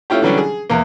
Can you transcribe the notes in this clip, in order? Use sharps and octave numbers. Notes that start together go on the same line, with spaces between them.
A3 C#4 E4 F4 G4
D3 E3 F#3 G3 C#4 D4
G#4
E2 A#3